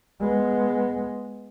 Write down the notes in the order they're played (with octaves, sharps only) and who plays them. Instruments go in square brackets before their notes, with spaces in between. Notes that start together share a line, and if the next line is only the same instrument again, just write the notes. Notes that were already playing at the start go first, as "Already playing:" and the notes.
[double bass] G#3 B3